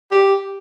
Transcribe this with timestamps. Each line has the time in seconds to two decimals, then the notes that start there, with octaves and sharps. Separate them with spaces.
0.11 G4